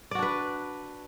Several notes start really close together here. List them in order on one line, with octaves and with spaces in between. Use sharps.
D5 F#4 D4 B4